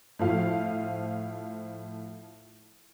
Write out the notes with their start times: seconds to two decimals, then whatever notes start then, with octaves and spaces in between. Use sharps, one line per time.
0.19 A2 F3 F5